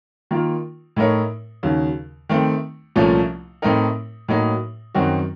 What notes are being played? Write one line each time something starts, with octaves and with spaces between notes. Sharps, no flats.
D#3 A#3 F4
A2 A3 D#4 A#4 C#5
D#2 C#3 F#3
D#3 A3 C4
C2 A#2 F3 A3 C#4
A2 A3 C4 D#4 A#4
A2 F#3 A#3 D#4
F#2 D#3 F#3 C4 F#4